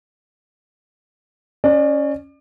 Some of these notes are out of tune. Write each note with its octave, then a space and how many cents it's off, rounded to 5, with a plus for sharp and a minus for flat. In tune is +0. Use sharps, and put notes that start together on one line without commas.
C#4 +0 D5 +30